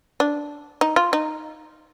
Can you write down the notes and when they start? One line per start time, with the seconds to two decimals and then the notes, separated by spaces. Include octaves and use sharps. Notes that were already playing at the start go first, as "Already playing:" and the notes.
0.20 D4
0.81 D#4
0.96 F4
1.13 D#4